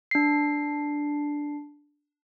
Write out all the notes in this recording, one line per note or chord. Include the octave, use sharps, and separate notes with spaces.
D4 C7